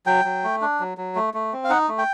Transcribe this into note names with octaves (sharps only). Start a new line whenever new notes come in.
F#3 G5
F#3
A3
D4
F#3
F#3
A3
A3
C4
F5
D#4 F#5
A3
G5